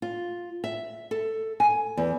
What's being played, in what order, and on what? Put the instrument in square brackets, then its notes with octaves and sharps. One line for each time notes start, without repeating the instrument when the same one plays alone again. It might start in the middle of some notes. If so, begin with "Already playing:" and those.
[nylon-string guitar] F4
E5
A4
G#5
E2